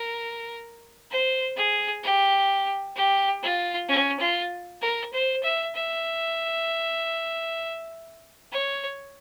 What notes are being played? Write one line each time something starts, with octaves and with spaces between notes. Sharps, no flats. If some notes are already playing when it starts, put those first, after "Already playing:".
Already playing: A#4
C5
G#4
G4
G4
F4
C#4
F4
A#4
C5
E5
E5
C#5